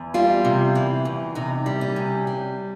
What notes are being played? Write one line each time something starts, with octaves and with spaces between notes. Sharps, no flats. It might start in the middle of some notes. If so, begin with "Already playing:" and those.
Already playing: E2
G3 F4
C3
E3
E2
C3 D#4
G3
C#4
C3
G3